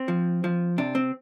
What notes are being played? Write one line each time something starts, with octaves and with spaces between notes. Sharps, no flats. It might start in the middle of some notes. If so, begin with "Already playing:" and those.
Already playing: C4
F3
F3
C3 D4
C4